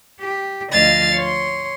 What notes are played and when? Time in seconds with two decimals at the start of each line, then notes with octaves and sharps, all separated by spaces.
0.19 G4
0.70 D2 F3 D#5 F5 A6
1.14 C#5 C6